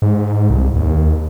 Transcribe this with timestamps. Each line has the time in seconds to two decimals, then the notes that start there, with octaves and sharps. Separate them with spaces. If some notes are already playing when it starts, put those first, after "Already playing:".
0.02 G#2
0.50 C2
0.76 D#2